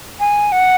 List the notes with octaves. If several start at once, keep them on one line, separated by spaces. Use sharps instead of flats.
G#5
F#5